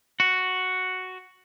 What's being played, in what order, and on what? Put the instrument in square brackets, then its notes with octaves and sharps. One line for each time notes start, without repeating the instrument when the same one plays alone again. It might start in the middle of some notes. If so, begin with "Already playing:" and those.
[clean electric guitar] F#4